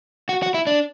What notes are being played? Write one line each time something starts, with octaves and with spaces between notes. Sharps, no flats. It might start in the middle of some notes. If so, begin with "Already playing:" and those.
F#4
F#4
E4
D4